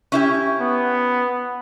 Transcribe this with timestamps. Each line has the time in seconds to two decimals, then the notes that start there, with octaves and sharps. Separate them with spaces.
0.12 C#4 E4 G4
0.60 B3